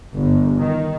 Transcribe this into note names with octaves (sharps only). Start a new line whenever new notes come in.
G1
D#3